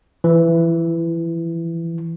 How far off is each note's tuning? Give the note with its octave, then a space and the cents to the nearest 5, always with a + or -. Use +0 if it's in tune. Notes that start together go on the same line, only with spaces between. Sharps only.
E3 +20